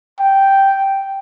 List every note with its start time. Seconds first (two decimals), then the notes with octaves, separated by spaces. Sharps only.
0.20 G5